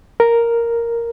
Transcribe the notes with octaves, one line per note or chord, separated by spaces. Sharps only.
A#4